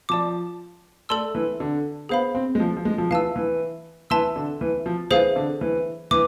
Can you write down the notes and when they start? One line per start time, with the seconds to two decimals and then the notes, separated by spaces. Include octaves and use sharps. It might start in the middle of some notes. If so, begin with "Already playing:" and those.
0.09 F3 D5 A5 D6
1.09 A3 A4 D5 A5 C6 E6
1.35 E3
1.60 D3
2.09 B3 G#4 C5 F5 B5
2.35 C4
2.55 G#3
2.60 F3
2.77 F3
2.85 G#3
2.98 F3
3.10 E3 F5 A5 E6
3.36 E3
4.10 E3 E5 A5 C6 E6
4.36 D3
4.61 E3
4.86 F3
5.11 E3 G#4 C5 F5
5.36 D3
5.61 E3
6.11 E3 D6